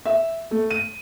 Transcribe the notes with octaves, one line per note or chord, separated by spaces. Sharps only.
E5
A3
D#7